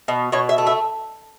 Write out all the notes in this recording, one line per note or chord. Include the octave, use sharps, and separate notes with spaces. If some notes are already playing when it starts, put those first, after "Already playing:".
B2
B2 C#5
E5
A3
E5